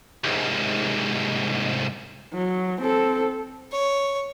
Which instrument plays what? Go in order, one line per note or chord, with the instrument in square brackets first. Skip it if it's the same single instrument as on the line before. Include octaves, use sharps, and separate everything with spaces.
[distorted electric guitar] C2 G#2
[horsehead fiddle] F#3
C4 A4
[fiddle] C#5